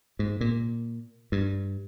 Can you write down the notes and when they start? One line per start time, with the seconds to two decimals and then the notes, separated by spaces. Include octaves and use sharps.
0.19 G#2
0.41 A#2
1.32 G2